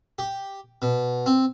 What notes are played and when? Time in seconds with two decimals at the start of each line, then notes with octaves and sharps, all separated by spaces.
0.19 G4
0.82 B2
1.26 C4